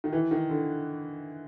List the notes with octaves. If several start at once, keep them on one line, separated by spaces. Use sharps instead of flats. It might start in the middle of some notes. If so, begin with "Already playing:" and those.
D#3
E3
D#3
D3